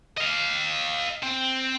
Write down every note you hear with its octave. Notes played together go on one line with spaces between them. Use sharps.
D#5 F5
C4